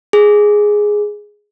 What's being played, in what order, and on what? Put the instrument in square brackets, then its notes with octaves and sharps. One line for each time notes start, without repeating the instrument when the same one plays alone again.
[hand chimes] G#4